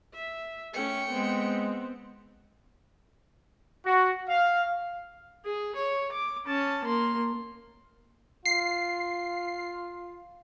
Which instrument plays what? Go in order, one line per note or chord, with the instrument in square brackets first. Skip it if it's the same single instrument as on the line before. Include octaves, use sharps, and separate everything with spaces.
[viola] E5
[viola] A3 C#4 [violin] G5 C#7
[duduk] G#3 [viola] B3 C4
[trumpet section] F#4
F5
[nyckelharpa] G#4
C#5
D6
C#4 A5
A#3 C6
[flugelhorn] F4 [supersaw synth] C7